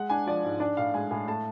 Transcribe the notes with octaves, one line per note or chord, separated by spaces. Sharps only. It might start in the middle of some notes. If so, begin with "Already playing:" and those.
Already playing: G#3 F#5
D4 G#5
F3 D5
G#2
D4 D5
A2 F5
G#3 G#5
A2 G#5
A3 A5